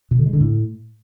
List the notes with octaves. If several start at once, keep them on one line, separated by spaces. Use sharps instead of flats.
B2
D3
G#3
D3
A2